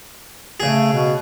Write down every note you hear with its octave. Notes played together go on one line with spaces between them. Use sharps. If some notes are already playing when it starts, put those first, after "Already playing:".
C#3 A3 G#4
B2